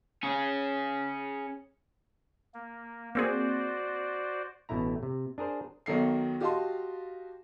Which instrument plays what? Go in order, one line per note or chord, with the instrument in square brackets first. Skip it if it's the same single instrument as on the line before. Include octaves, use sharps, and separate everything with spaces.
[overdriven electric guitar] C#4 G#4
[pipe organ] A#3
[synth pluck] A#3 C4 G#4 [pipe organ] F#4 C5 D5
[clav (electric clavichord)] A1 B2 A3 E4 A#5
C3
D4 G#4 A#4 C5
[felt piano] B1 B2 D#3 A4 C7
F#4 G4 D#5 F5 A5 C6